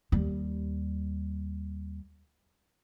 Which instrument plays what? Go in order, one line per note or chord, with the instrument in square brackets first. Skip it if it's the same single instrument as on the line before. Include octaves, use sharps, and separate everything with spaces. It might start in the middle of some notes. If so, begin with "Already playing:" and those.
[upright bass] D#2 G3